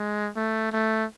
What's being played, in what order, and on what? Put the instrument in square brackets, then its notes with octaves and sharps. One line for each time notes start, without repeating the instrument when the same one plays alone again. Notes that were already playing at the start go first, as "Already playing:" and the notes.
Already playing: [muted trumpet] G#3
A3
A3